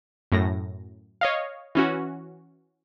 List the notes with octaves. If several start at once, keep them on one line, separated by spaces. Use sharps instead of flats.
F#2 A2 A#6
C#5 D#5 F5
E3 C#4 F#4